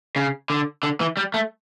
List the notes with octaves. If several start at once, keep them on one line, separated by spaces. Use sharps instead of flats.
C#3
D3
D3
E3
G3
A3